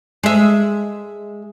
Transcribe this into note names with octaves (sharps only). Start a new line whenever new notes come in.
G#3 E5